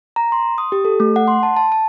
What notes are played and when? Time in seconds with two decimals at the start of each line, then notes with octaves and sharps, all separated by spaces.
0.16 A#5
0.32 C6
0.58 D#6
0.72 G4
0.85 A4
1.00 A3
1.16 F#5
1.28 C6
1.43 A5
1.57 A5
1.72 A5